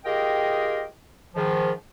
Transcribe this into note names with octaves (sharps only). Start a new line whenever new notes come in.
F4 G4 G#4 A#4 D#5 G5
G#2 D#3 F3